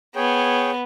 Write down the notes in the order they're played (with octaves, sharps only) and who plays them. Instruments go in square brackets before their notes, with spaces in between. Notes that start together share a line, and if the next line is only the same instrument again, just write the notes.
[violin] B3 [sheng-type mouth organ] G#4 C#5 G5